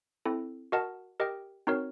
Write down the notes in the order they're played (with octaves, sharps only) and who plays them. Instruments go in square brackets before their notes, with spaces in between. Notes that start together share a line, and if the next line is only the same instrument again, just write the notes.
[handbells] C4 E4 A4
F#4 A#4 D#5 F#5 A5
G4 A#4 D#5 G5
C4 D#4 F#4 A#4 C#5